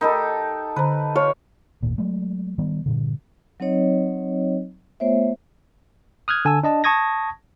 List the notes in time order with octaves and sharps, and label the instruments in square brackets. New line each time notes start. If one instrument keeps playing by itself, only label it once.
[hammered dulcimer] D#4 G4 A4 [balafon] A#4 D#5 B5
[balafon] D3 C5 A#5 [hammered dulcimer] B4
[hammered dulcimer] F4 [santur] C#5
[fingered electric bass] G#1 D#2 A#2
F#3 G#3 A3
D#3 G3 B3
G2 A#2 D3
[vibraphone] F#3 C4 D#4 C#5 D#5
A3 B3 F4 C5 C#5 E5
[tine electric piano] D#6 F6 F#6 G#6
D3 G#5 A5 E6
D4 D#5 A5
A5 C#6 D#6 G#6 A#6